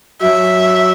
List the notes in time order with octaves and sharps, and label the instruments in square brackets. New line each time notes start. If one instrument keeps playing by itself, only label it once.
[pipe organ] F#3 [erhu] E5